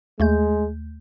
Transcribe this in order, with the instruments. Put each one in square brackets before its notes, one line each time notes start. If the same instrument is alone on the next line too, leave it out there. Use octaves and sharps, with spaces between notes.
[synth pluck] D#2 A3 G6 [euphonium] G#3